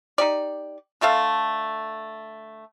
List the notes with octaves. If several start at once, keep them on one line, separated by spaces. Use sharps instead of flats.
D#4 G4 D5
D3 A3 A4 F5